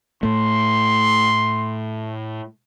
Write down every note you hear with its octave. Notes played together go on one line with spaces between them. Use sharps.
A2 A3 C6